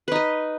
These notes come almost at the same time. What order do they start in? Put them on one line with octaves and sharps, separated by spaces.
B4 D#4 D#5